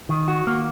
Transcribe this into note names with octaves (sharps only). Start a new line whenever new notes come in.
D#3
F#4
A#3